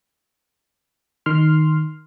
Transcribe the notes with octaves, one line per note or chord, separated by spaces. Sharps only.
D#3 C6 F6